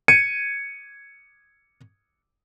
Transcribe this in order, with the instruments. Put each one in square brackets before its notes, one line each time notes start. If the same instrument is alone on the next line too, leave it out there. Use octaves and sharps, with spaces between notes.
[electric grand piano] G#6 C#7 D#7